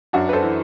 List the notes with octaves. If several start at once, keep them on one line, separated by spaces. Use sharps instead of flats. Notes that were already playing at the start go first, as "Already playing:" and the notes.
F#2 D4 F#4
B4
A4 C5
E3